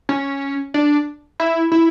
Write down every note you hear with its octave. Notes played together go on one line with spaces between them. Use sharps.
C#4
D4
E4
E4